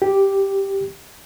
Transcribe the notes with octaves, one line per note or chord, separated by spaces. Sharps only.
G4